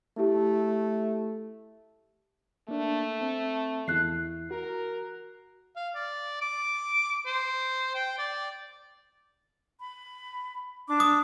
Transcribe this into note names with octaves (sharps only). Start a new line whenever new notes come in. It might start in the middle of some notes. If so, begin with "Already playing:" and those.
A3 E4 G4
A3 A#3 D4
C4
E2 E4 F#6 C7
F#4 A#4
F5
D5
D6
C5
G5
D5
B5
D4 D6
D#6